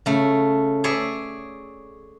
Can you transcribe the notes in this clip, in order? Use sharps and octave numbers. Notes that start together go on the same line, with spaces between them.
C#3 A3
G#4 C#5 D5 E5